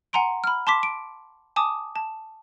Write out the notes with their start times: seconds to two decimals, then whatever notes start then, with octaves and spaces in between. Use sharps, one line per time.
0.13 F#5 G#5 A#5 C6 D7
0.44 B5 F6
0.67 A5 C6 D6 B6
0.83 D7
1.56 G#5 A5 D6 D#6
1.96 A5